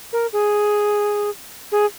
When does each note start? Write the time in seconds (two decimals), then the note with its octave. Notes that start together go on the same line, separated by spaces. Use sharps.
0.13 A#4
0.33 G#4
1.72 G#4